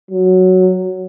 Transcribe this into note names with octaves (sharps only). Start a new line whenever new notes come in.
F#3